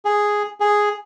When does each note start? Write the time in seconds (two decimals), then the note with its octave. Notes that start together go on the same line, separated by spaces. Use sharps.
0.05 G#4
0.60 G#4